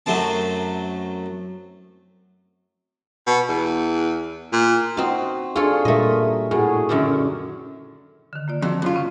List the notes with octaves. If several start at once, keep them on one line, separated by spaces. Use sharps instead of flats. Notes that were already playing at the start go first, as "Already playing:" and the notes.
F#2 F#3 A3 C4 A5
B2
E2
A#2
C4 D#4 F#4
D4 F4 G#4 A4 C#5
A#2 G3 A3 A#4 D#5
A2 E4 F#4 G#4
F#2 D3 D#3
D3 D#3
A#3 F4 D5
F2 D#3 F#4
F#2 F4
C#3 C#4